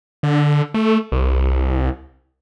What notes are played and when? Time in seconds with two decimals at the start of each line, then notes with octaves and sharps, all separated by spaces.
0.23 D3
0.74 A3
1.12 C2